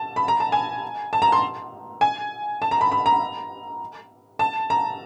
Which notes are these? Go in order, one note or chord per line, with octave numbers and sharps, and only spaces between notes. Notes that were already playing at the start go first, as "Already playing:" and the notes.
Already playing: A5
B5
A#5
A5
G#5
A5
A#5
C6
G#5
A5
A#5
B5
B5
A#5
A5
A#5